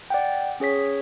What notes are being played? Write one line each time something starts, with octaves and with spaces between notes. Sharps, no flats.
D5 F#5 G5
C#4 G#4 C#5 B6